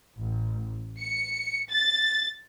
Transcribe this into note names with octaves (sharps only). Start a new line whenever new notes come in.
A1
C#7
A6